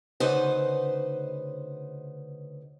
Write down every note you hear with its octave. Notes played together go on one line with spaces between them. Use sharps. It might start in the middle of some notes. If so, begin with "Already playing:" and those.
D2 C#3 D#4 B4 C5 F#5